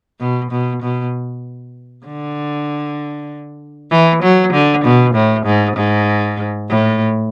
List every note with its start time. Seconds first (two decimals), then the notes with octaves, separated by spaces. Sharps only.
0.21 B2
0.51 B2
0.83 B2
2.06 D3
3.91 E3
4.23 F#3
4.53 D3
4.84 B2
5.15 A2
5.46 G#2
5.77 G#2
6.69 A2